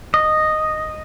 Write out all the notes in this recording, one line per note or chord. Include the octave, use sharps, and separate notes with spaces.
D#5